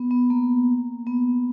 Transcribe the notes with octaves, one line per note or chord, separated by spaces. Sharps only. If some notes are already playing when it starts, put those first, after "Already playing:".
Already playing: B3
B3
A#3
B3